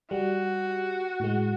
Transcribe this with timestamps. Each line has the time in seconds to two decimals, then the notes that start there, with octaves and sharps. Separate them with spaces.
0.11 G3 F#4
1.20 A2 G#3